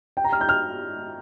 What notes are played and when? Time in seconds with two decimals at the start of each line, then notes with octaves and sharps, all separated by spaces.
0.17 G5
0.24 A#5
0.33 F6
0.41 G6
0.49 F6